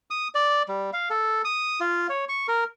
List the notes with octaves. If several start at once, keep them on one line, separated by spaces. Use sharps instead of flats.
D#6
D5
G3
F5
A4
D#6
F4
C#5
C#6
A#4